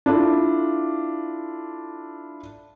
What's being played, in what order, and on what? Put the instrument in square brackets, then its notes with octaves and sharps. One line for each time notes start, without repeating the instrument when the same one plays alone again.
[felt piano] D4 E4 F4 A4